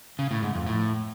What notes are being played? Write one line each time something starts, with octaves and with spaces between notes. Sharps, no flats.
C#3
A2
G#2
F2
A2